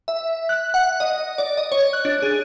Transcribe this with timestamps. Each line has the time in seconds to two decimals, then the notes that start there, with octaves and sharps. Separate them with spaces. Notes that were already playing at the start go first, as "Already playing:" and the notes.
0.08 E5
0.49 F#6
0.74 F#5
1.00 D#5
1.38 D5
1.57 D#5
1.72 C#5
1.93 F#6
2.05 D4
2.22 G#4